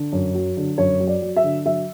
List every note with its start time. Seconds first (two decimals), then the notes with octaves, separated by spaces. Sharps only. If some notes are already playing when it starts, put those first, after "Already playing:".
Already playing: D3
0.13 F#2
0.35 F#3
0.57 D3
0.78 F#2 C#5
1.00 F#3
1.07 D5
1.22 F#3
1.36 E5
1.43 D3
1.65 F#3 E5